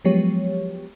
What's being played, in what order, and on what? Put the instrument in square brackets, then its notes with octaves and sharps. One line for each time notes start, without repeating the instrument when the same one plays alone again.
[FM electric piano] F3 F#3 G#3 B3 G4 C#5